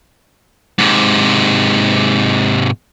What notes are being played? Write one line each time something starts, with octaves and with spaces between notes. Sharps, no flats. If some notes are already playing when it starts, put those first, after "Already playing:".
G#2 C3